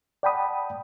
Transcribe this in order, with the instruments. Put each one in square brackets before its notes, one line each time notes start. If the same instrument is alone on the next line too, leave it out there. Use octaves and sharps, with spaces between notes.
[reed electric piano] D5 F#5 G5 A5 B5 D#6